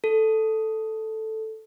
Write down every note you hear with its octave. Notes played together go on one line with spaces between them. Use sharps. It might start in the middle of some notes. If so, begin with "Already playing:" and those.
A4